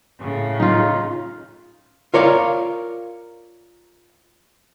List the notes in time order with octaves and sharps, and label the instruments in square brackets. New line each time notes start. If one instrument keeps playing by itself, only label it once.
[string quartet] A2 C#3
[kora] D#4 F4
[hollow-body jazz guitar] F4 A#4 C#5 D5 F5